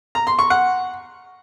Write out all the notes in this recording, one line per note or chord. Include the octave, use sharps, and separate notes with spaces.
A#5
C6
C#6
F#5